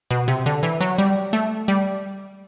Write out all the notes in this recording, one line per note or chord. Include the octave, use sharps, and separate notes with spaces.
B2
C3
D3
E3
F#3
G3
A3
G3